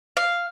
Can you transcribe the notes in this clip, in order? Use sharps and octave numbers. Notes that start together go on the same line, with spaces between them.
F5